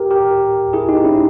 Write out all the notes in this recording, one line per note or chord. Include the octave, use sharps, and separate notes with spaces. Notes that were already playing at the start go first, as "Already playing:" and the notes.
Already playing: G4 A#4
G4 A#4
E4 G#4
D#4 G4
C#4 E4